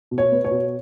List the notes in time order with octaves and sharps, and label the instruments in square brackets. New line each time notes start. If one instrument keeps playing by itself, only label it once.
[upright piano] B2
C#5
B3
C#5
B2